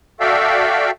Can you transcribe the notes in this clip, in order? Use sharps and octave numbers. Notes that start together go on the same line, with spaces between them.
F#4 A4 D5 E5 F5 G5